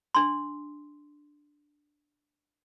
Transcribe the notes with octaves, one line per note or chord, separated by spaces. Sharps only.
D4 C6